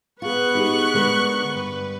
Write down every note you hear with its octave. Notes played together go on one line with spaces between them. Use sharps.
B3 F4 G#4 B4 C#6 F#6
D#4 G4 G#4
D3 G#3 A#4
G2 B4